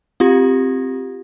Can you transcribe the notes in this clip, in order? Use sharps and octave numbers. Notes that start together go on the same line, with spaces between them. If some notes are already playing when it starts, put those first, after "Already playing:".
C4 F4 G4